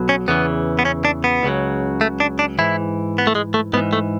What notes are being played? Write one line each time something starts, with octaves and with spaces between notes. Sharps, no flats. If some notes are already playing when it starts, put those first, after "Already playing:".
Already playing: B1 B2 F#3
C#4
E2 C#3 E3 B3
B3
C#4
D4
B3
C#2 C#3 F#3
A3
D4
D4
G#2 E3 E4
B3
A3
G#3
A3
G#2 E3 B3
A3